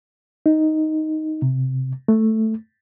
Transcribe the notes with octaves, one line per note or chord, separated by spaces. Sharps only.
D#4
C3
A3